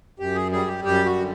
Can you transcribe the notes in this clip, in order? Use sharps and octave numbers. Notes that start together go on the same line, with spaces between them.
F#2 G4
G#4
G3 G#4
G4
F#2 G4
F#4
D3